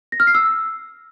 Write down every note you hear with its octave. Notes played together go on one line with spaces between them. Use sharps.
A#6
F6
C7
E6